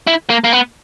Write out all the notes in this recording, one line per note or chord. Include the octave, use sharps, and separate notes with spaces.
E4
A#3
A#3
B3